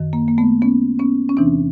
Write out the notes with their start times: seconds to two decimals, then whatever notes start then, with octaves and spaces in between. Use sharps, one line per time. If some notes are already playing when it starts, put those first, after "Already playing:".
Already playing: F#2 D#3
0.13 A#3
0.28 A#3
0.38 A3 B3
0.62 B3 C#4
0.99 B3 C#4
1.29 C#4
1.37 E2 C3 E3 C4 D4